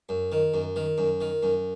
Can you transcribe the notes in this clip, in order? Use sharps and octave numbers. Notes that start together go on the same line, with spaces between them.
F#2
D#3
F#2
D#3
F#2
D#3
F#2